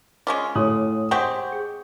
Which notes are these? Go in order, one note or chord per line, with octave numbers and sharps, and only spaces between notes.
G#3 C#4 F4 D6
A2 C#5 D#6
G#3 C4 G4 F#5 C#6
G#4